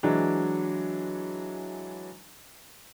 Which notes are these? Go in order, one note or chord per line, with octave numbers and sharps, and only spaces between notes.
E3 F#3 G#3 D4